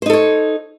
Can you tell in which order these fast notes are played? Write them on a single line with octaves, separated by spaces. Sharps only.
C5 D#4 A4 C#5